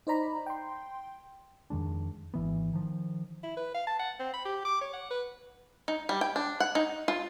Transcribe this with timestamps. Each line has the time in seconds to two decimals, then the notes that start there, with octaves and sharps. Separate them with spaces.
0.07 D#4 C5 D5 A#5 B5
0.46 G5 C6
1.70 F2 D#3 G#3 D4
2.34 G#1 E3 B3
2.73 D#3 F3
3.43 E4
3.57 B4
3.74 F5
3.87 A5
3.99 F#5
4.19 C4
4.33 B5
4.45 G4
4.65 D6
4.81 C#5
4.93 F#5
5.10 B4
5.88 D#4
6.09 G3
6.21 G5
6.36 D4
6.60 F#5
6.75 D#4
7.08 F4